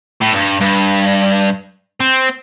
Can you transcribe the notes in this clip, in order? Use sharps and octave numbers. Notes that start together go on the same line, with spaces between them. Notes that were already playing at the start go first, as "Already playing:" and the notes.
A2
G2
G2
C4